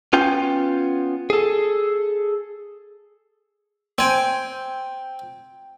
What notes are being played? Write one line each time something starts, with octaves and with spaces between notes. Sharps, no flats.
B3 C#4 F4 G5
G#4 A4
C4 G5 G#5 D7